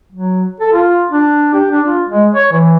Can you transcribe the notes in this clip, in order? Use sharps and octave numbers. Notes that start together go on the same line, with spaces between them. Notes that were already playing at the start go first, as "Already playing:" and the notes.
F#3
A4
F4
D4
G4
D4
F4
G#3
C#5
E3